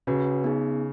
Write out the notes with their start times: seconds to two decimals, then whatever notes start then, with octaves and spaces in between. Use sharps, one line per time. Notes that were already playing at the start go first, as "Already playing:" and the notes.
0.07 C#3 C#4 F#4 B4
0.44 B3 D#4 G#4